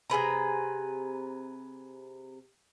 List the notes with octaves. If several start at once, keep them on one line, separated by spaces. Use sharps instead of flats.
C3 G#4 B4 A#5